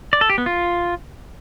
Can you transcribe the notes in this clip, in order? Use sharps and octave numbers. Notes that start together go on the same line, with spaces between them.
D5
A4
G4
B3
F4